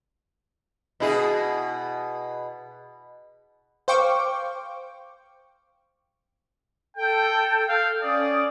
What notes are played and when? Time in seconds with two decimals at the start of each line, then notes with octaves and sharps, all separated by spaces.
1.00 B2 E4 G#4
3.88 C5 F5 G5 C#6 D6
6.97 A4 G5 G6
7.69 F5
8.03 C#4 D5 D#6